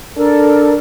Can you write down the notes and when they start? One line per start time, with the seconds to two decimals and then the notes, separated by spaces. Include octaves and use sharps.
0.17 D4 A4 A#4